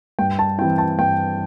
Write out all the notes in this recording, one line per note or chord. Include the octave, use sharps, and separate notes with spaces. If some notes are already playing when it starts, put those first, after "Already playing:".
G2 G5
A5
E3 C4 E4 G5
A5
G2 G5